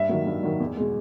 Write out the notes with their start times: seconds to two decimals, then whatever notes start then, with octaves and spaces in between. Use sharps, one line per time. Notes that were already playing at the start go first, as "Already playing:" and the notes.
Already playing: G2 E5
0.09 D#3 F#3
0.26 G2
0.43 D#3 F#3
0.60 E2
0.77 B2 G#3